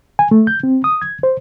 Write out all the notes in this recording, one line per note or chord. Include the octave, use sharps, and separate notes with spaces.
G#5
A3
G6
C4
D#6
G#6
C5